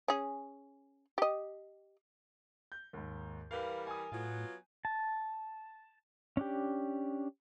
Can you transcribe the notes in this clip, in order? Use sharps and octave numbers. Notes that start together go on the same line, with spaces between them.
C#4 G#4
G4 D#5
G6
D#2 G#2
E3 G3 A#4 B4 F5
G#5 D#6
A2 F#3 B3 F4
A5
C#4 D4 G4